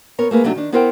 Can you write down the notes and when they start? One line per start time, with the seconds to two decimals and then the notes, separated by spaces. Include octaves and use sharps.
0.18 B3 A#4 C#5
0.31 A3 A#3 G#4 B4
0.44 C3 F#3 A3 D4 D#4
0.55 D#3 D4
0.72 B3 E4 A#4 C5 F#5 G5